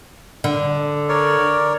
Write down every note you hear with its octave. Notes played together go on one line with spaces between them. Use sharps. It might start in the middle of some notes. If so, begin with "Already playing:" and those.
D3
A#4 C#5 D5